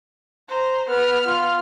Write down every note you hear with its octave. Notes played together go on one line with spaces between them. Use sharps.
C5 A#5
B3 B4 F6
F4